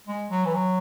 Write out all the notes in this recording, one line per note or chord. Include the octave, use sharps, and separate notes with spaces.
G#3
F#3
E3
F#3